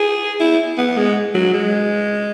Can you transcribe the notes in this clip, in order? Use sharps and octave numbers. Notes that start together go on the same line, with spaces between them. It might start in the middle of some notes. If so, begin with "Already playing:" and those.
Already playing: G#4
E4
B3
G#3
F#3
G#3